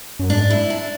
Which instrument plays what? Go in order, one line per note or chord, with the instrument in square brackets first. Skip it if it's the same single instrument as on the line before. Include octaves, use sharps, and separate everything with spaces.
[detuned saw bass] F#2
[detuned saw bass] G#2 [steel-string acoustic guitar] D4
[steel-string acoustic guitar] E4
D4